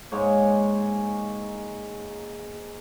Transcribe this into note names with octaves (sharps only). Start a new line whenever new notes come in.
G#2 G#3 A#3 C#5